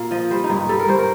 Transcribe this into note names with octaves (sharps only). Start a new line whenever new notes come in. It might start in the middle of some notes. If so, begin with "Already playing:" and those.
Already playing: A#2 F5
F3 D#5
G3 C5
D#4
G2
D#4
G3 A4
A#4
G2 C5
A#4